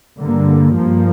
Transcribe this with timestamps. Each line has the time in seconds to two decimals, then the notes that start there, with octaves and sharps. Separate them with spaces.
0.19 G2 D3 A#3
0.75 G2 F3 A#3